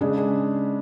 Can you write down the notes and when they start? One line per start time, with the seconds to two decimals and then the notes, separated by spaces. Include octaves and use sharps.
0.01 C#3 G#3 D4 G#4
0.18 G#4